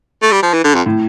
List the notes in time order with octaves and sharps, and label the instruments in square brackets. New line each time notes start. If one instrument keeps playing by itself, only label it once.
[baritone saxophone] A3
G3
F3
E3
D3
F2
[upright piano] A2